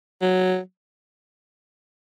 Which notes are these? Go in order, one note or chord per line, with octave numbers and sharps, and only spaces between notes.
F#3